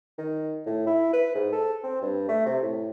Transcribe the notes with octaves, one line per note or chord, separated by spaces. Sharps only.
D#3
A2
E4
B4
G#2
A4
C4
G2
A3
C3
A2